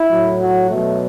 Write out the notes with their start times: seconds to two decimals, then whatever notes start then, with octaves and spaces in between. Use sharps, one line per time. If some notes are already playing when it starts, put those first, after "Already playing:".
Already playing: E4
0.09 A2 F#3
0.40 F#4
0.69 B2 F#3 A3